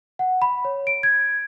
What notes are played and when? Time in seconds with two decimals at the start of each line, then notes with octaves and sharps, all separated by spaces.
0.19 F#5
0.42 B5
0.65 C#5
0.87 D7
1.03 G#6